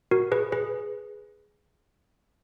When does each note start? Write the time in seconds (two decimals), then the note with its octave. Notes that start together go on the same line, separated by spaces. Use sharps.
0.11 F#4 A#4
0.32 G#4 B4
0.52 G#4 B4